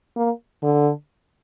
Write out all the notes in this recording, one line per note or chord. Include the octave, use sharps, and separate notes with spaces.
A#3
D3